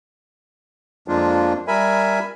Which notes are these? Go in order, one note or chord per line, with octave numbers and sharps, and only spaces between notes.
F2 F3 G#3 A#3 D4 F4
G3 A#4 E5 G#5 B5